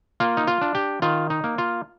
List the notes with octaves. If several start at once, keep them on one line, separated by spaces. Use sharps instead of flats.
A#3 F4
D#4
F4
D4
G4
D#3 F4
D#4
A#3
F4